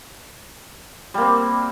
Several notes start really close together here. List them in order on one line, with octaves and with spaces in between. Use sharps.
G3 A#3 C4